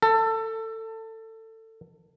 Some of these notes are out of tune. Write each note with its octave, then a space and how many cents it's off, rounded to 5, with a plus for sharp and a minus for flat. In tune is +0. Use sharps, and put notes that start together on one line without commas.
A4 +20